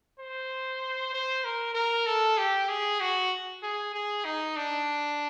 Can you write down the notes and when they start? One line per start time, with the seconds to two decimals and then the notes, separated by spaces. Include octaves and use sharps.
0.19 C5
1.13 C5
1.44 A#4
1.75 A#4
2.06 A4
2.38 G4
2.69 G#4
3.00 F#4
3.63 G#4
3.94 G#4
4.25 D#4
4.57 D4